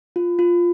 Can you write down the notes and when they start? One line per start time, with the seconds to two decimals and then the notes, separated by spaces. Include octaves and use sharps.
0.16 F4
0.39 F4